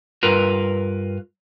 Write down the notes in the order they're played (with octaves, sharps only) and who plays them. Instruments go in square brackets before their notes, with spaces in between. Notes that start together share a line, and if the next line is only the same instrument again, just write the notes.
[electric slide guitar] G2 F4 A#4 B4